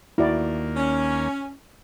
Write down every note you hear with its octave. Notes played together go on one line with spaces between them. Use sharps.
D#2 A#3 E4 F#4 D5
C#4